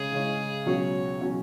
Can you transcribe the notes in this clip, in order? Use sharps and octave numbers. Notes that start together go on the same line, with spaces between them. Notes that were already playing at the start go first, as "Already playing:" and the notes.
Already playing: C#3 G#3 C#4 G#4
C#3 G#3 C#4
C#2 B2 F#3 C#4 F#4 C#5
B2 F#3 C#4 F#4